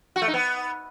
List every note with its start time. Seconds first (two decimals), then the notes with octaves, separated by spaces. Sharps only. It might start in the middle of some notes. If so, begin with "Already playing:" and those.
0.16 F#4
0.22 A3
0.28 D#4
0.34 B3